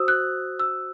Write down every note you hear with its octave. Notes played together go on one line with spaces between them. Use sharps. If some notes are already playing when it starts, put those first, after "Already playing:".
Already playing: F#4 C5 D#6 E6
F#6
E6